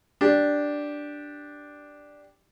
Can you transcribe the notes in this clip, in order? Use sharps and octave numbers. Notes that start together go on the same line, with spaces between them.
D4 G4